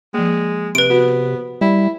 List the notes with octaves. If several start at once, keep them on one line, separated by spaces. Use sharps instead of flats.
F3 G#3 A#3
C3 B4 D7
B3 F#4
G3 E4